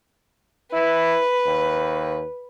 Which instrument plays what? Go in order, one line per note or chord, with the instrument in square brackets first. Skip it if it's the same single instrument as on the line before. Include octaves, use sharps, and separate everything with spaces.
[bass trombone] E4 [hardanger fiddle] B4
[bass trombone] D#2